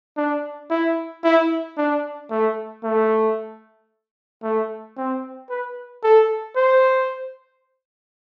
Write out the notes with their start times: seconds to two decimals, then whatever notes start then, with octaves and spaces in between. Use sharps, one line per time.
0.17 D4
0.70 E4
1.24 E4
1.77 D4
2.30 A3
2.83 A3
4.43 A3
4.97 C4
5.50 B4
6.03 A4
6.56 C5